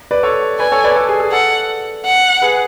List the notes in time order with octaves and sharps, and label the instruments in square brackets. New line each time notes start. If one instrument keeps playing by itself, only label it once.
[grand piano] B4 D5
A4 C#5
[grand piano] B4 D5 [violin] G#5
[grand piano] A4 C#5
B4 D5
A4
G#4
G#4
[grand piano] A4 [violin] F#5
[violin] F#5
[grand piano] G#4 B4